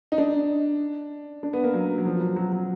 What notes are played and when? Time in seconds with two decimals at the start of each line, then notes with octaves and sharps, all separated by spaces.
0.12 D#4
0.18 D4
1.43 D4
1.53 B3
1.64 A#3
1.74 F#3
1.98 F#3
2.05 F3
2.21 F#3
2.36 F#3
2.52 F#3